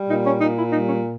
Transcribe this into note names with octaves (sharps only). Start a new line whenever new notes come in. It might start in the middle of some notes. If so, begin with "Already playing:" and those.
Already playing: G3
A#2 D#4
C#4
A#2 D#4
E4
G3 D#4
C#4